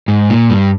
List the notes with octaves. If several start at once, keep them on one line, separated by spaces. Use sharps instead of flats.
G#2
A#2
G2